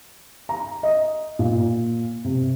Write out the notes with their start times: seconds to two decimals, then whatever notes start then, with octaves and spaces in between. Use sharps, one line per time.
0.49 A#5
0.83 D#5
1.39 A#2
2.25 C3